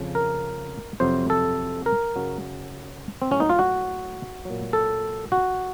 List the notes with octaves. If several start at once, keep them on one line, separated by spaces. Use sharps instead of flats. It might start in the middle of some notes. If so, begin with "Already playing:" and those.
Already playing: F2 C#3 F3
A#4
F2 C3 F#3 C5
A4
A#4
F#2 C#3 F#3
C4
A2 F#3 C#4
D#4
F4
F#4
A#2 F#3
A4
F#4